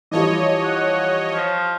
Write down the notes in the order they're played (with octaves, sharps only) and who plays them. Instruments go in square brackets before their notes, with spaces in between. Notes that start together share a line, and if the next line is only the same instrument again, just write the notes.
[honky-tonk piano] E3 F3 G3 [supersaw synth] C#5 D#5
[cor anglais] F#5
F3